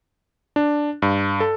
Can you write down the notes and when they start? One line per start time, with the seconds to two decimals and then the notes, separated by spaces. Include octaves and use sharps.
0.56 D4
1.02 G2
1.40 A4